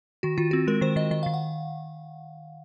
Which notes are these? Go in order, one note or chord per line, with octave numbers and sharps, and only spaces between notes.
D#3 F#4
D#3 F4
C4 F#4
G#3 A#4
D#3 C5
D#3 D#5
D#3 D#5
D#3 F5
F#5